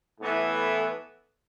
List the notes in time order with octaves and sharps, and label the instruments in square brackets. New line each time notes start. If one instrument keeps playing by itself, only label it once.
[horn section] A2 E3 B3 E4 A4